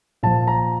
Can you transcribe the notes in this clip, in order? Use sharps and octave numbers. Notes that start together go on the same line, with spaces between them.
A#2 F3 A5
A#5